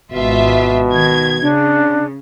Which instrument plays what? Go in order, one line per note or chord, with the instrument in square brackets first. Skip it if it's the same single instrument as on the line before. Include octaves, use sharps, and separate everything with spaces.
[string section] G#1 F4 E5 [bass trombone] B2
[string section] D#3 G#6
[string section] C#3 [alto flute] D4